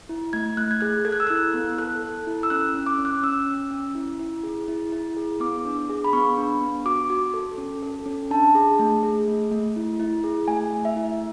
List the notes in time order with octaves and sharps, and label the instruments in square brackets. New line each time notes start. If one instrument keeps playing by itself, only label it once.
[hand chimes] E4
A3 G#6
A3 F#6
G#6
G#4 F#6
A4 G#6
F#6
E6
E4 F#6
B3
A4 F#6
A4
E4
E6
C#4 F#6
C#4
D6
C#4
F#6
C#4 E6
C#4
C#4
E4
E4
G#4
E4
E4
G#4
B3 D6
D4
G#4
B5
B3 C#6
D4
B3
F#4 D6
F#4
A4
C#4
A4
C#4
D4 A5
G#4
A3
G#4
A3
A3
E4
E4
G#4
A3 G#5
A3
E5
E4